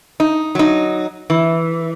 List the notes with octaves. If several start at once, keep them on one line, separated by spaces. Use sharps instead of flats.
D#4
F#3 D#4
E3